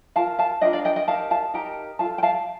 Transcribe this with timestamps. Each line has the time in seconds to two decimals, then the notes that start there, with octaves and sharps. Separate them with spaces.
0.16 F4 A#4 F5 A5
0.39 F5 A5
0.61 D4 F4 A#4 D#5 G5
0.73 D5 F5
0.85 D#5 G5
0.96 D#5 G5
1.07 D#4 G4 A#4 F5 A5
1.31 F5 A5
1.53 D#4 G4 A#4 G5 A#5
1.99 F4 F5 A5
2.04 A4
2.18 G5
2.23 F5 A5